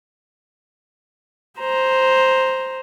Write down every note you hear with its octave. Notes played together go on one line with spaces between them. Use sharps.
C5 A#5